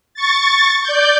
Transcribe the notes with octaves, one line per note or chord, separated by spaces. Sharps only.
C#6 A6
D5 G6